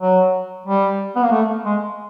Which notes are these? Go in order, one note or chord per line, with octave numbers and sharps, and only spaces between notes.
F#3
G3
B3
A#3
A3
G#3